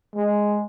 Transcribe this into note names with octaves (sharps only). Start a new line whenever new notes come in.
G#3